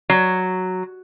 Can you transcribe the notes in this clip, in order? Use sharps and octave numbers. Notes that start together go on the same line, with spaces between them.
F#3